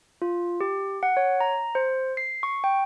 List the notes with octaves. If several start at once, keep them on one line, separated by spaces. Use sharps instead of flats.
F4
G4
F#5
C#5
A#5
C5
C7
C#6
G5